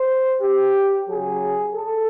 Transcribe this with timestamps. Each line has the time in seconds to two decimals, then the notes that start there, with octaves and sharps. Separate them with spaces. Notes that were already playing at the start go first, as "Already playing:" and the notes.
Already playing: C5
0.42 G4
1.08 C#3 F#3 G#4
1.75 A4